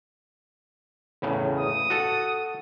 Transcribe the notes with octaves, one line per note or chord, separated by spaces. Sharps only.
E2 A2 C#3
D#6
F#4 A4